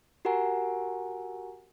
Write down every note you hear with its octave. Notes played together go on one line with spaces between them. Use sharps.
F#4 G4 A#4 F#5 G#5 A#5